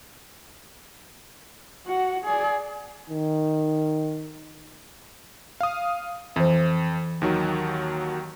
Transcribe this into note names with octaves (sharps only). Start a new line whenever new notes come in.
F#4 F#5
G#4 D5
D#3
F5 D#6
F2 E3 C5
D#2 D#3 F#3